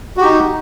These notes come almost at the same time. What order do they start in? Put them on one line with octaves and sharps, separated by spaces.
F#4 G4 D#4